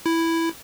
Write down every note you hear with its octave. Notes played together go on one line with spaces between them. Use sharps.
E4